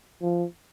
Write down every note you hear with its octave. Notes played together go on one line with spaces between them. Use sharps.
F3